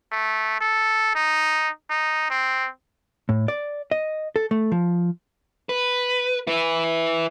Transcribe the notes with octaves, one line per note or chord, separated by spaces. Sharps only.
A3
A4
D#4
D#4
C4
A2
D5
D#5
A4
A3
F3
B4
E4 B4